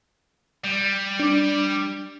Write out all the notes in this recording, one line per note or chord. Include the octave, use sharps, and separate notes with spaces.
G3
D4